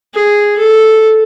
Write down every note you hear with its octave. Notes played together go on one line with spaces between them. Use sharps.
G#4
A4